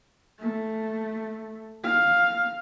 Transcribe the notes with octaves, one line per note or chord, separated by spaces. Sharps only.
A3
F5